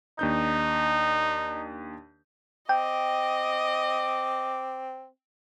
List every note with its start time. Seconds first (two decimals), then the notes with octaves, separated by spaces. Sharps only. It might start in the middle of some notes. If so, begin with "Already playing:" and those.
0.19 D#2 D4 D#4 G6
2.69 C4 D#5 G5 D6